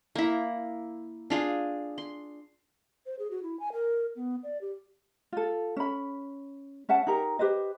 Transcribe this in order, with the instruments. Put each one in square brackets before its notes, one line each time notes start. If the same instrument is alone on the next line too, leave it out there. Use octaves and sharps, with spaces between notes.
[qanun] A#3 E4
D4 F4 G#4
C6
[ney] C5
G#4
F#4
E4
G#5
A#4
B3
D5
G4
[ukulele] F4 A4
C#4 B5
C#4 E5 F#5 A5
D#4 G4 A#4
G4 B4 C5 D#5